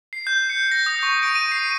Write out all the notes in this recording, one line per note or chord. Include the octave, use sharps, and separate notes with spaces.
C7
G6
C#7
A#6
D#6
C#6
D7
D#7
C7